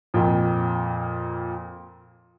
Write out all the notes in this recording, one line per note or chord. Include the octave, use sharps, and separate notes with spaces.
F2 A#2 A#4 G5